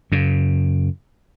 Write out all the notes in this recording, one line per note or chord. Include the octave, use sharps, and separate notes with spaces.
F#2 C#3